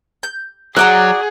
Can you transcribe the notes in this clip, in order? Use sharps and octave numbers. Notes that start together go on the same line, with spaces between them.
G6
F#3 F#4 G#4 D5 F#5 A#5